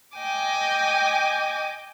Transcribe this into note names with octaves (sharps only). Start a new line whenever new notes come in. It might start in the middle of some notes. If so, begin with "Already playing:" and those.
D#5 G5 G#5 D6